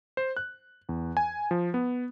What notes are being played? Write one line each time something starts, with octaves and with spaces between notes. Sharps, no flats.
C5
F#6
E2
G#5
F3
B3